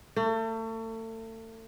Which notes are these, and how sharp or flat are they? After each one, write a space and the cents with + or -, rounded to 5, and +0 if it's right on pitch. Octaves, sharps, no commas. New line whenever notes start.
A3 +35